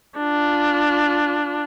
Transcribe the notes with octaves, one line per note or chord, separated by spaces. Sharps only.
D4 F4